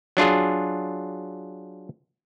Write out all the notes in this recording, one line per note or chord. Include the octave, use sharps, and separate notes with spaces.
F#3 D4 F4 G#4